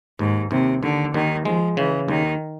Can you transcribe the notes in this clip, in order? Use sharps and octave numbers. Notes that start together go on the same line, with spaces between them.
D#2 G#2
D#2 C3
D#2 D3
D#2 D#3
F3 G#3
C#3 E3
D#2 D#3